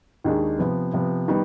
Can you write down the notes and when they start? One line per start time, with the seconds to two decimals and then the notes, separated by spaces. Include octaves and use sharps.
0.24 D#2 D#3 G#3 D4 G#4
0.58 C3 F3 B3
0.93 C3 F3 B3
1.28 D#3 G3 B3